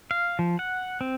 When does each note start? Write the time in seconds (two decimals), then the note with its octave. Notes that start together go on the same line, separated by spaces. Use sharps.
0.11 F5
0.39 F3
0.59 F#5
1.01 C4